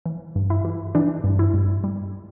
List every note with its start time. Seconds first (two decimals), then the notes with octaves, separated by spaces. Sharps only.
0.05 E3
0.35 G2
0.50 E4
0.65 E3
0.95 E3 D4
1.24 G2
1.39 E4
1.54 G2
1.84 G3